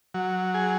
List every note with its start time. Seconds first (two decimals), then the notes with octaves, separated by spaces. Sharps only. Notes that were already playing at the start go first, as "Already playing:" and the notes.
0.14 F#3
0.54 G#4